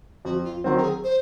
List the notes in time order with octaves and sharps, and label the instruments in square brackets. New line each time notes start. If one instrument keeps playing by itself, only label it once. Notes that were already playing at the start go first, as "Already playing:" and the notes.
[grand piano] F2 [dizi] F#4
[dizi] F4
[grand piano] D#3 F#3 C4 [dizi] F#4
[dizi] A#4
G#4
C5